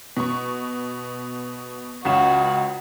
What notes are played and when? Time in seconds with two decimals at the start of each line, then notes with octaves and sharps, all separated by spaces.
0.17 B2 C#6
2.05 C#2 C#3 F#4 E7